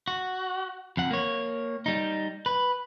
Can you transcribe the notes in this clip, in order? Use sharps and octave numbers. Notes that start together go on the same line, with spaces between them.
F#4
F2 F#5
A#3 C#5
G3 D#4
B4